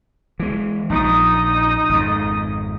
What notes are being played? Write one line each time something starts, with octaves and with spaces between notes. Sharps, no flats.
E3 G#3
A#1 A#2 D#4 D#6
G#1 F2